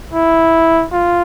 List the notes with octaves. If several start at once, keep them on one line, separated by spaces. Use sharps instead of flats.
E4
F4